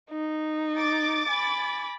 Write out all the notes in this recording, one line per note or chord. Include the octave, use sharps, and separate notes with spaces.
D#4
D6 A6
G#5 B5